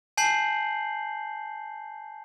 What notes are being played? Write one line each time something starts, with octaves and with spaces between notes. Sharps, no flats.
G#5 A5 G6 C7 F#7